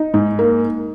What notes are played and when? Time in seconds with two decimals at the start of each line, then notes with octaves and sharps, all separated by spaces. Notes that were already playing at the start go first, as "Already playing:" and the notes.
Already playing: D#4
0.14 G#2
0.39 A#3